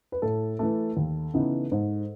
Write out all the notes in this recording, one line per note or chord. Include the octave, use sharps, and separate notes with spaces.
B4
A2 A4
E3 A3
D#2
C#3 E3 B3 D#4
G#2